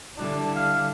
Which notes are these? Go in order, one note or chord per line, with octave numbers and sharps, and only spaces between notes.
D3 G3 D4 E4
F5